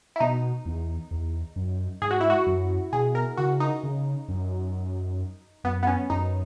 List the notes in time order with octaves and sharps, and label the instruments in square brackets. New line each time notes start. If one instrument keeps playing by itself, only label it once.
[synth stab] E4
[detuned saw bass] B2 [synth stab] D#4
[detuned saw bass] E2
E2
F#2
[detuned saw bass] G#2 [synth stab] G#4
[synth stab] F#4
E4
F#4
[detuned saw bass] F#2
[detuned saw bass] B2 [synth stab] G#4
[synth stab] A#4
[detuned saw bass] C#3 [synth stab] F#4
[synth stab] D#4
[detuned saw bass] C#3
F#2
[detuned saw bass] F#2 [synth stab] B3
[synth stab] B3
C#4
[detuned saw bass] F#2 [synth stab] D#4